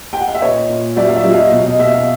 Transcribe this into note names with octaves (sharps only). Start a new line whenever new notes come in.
G5
F#5
F5
E5
A#2 C#5 D#5
A#2
F#3 D5 E5
F5
D5 E5
F#3
D#5 F5
B2
D#5
B2 E5
F5